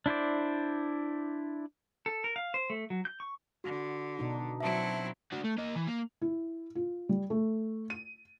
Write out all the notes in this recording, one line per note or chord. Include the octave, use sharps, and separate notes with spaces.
D4 E4 C5 D5
A4
A#4
F5
C5
A3
F#3
G6
C#6
D3 F#4
B2 D4 D#4
F#3 C4 E4 E5 A5
D4 F#4
A3
A#3 D#5
E3
A#3
E4
F4
G3
A3
D#7